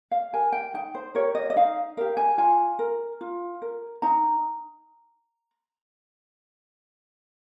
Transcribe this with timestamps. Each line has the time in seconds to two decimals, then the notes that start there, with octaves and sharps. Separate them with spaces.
0.11 F5
0.33 G4 A#4 G#5
0.52 G5
0.74 D#4 G5
0.95 C5
1.15 G4 A#4 C#5
1.35 D#5
1.50 D#5
1.56 D#4 F5
1.97 G4 A#4 F5
2.17 G#5
2.38 F4 G#5
2.79 A#4
3.21 F4
3.62 A#4
4.02 D#4 A#5